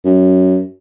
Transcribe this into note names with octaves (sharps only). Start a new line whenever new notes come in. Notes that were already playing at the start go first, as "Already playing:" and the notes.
F#2